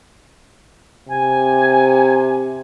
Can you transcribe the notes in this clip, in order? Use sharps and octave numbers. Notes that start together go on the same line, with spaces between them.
C3 G#5